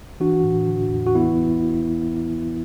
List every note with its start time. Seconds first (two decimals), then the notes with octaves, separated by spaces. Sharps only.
0.20 E3 D4 F#4
0.44 A2
0.68 D3
0.92 E2
1.06 F#4
1.15 E3 B3 E4